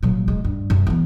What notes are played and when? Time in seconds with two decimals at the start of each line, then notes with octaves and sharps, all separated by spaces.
0.03 A#2 F#3
0.28 G#3
0.45 G2
0.70 F#2
0.87 E3 B3